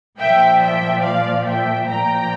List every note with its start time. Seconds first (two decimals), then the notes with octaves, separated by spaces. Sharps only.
0.19 A#2 F3 E5 G5
0.61 E5 G5
1.03 D5 F5
1.46 E5 G5
1.87 A#2 F3 G5 A#5